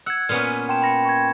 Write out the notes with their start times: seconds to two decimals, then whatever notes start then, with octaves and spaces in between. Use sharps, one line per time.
0.06 F#5 E6 F#6 G#6
0.29 A#2 B3 C#4 F6
0.69 G5 A5 C6 E7
0.82 B5 A#6 C#7
1.05 C#6 G#6